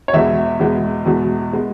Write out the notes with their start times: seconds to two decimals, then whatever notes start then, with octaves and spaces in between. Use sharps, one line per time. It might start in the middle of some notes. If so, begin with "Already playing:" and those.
0.08 C#5
0.13 E2 B2 G#3 B3 E5
0.59 E2 B2 G#3 B3
1.05 E2 B2 G#3 B3
1.53 G#3 B3